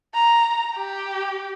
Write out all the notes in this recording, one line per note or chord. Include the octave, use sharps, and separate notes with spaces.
A#5
G4